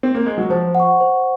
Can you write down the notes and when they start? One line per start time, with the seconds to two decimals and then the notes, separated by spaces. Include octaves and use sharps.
0.03 C4
0.15 A#3
0.26 G#3
0.38 F#3
0.50 F3 C5
0.75 F#5
0.80 C#6
1.01 C5